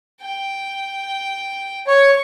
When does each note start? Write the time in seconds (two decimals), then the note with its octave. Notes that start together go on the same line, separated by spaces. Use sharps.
0.21 G5
1.87 C#5 C#6